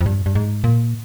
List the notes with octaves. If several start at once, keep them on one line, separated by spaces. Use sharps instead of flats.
F2
G2
G2
G#2
A#2